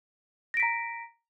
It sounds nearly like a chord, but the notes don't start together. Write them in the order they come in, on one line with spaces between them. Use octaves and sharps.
A#6 D7 B6 A#5